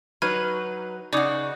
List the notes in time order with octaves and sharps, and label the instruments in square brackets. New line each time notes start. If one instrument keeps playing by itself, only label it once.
[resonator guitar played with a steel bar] F#3 D#4 [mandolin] B4 [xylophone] F6 G#6 D#7
[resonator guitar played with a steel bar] C#3 [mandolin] D#4 F#4 [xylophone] D5 D6 D#6